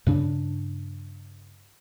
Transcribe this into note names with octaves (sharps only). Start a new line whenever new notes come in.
G2 C#3 D4